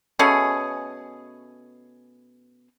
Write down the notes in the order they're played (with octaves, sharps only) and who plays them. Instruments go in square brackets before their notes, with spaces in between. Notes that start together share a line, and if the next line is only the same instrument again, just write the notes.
[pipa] B2 A3 C#4 G#4